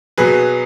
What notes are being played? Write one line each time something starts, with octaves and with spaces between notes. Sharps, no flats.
B2 F#3 G#4 B4